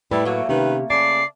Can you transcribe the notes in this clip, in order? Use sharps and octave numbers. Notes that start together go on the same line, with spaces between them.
A2 G3 A3 D4 E4 B4 D5
F#3 A3 A#3
C3 D#3 C#4 G4 B4
C#3 D5 G#5 A5 C7